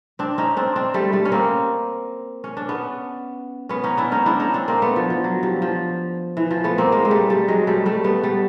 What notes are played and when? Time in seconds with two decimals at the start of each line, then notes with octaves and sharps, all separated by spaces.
0.19 C4 D4
0.38 C#4 D#4
0.57 C4 D4
0.76 C4 D4
0.94 G3 A3
1.13 G3 A3
1.25 C#4
1.32 A#3 C4
2.44 C#4
2.57 D4
2.69 B3 C#4
3.69 B3 C#4
3.84 C#4 D#4
3.97 D4 E4
4.12 C#4 D#4
4.26 D4 E4
4.40 C#4 D#4
4.54 C4 D4
4.68 A#3 C4
4.82 A3 B3
4.96 F3
5.10 F3
5.24 F#3
5.43 F3 G3
5.62 F3
6.37 E3
6.51 F3
6.64 A3 B3
6.78 A#3 C4
6.92 G#3 A#3
7.05 G#3
7.11 G3 A3
7.30 G3 A3
7.48 F#3 G#3
7.67 G3 A3
7.86 G3 A3
8.04 A3 B3
8.23 G3 A3